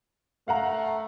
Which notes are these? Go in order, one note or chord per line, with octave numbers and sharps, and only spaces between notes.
A3 F5 F#5 A#5